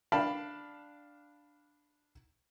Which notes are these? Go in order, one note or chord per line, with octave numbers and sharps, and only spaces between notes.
D4 F5 G5 A5 B5